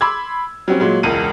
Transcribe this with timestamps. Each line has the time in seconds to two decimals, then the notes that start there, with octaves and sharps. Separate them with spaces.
0.01 B5 C6 D6 E6 G#6
0.68 F#3 G3 C4 C#4
0.80 A#2 F#3 G#3
1.03 E1 C#2 D#7